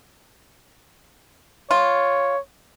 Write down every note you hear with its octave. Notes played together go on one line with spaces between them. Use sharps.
F4 C#5